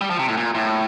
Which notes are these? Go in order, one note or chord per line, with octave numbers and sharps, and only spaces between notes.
G3
F3
C3
A2
A#2
A2